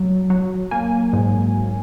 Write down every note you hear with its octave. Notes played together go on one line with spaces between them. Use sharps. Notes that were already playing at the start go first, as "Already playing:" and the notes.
Already playing: F#3
F#3
A#3 G#5
G#2